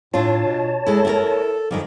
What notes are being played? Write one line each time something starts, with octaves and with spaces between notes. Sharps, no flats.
A2 D4 F4 C#5 A5
B2
G#3 E4 A4
E4 G4 A#4
F#2 D#3 F3 G3